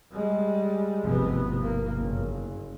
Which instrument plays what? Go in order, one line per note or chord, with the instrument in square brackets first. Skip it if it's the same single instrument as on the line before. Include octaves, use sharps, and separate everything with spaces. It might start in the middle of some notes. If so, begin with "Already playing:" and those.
[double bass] G3 G#3
[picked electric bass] G1 F3 [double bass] C3 B3
[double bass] A#3
F#1